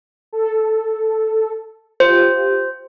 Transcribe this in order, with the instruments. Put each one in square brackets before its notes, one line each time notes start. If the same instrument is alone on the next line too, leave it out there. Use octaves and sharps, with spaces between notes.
[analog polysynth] A4
[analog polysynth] F4 G4 [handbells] C5